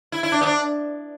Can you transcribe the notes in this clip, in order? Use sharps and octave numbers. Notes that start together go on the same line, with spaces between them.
E4
E4
D4
B3
D4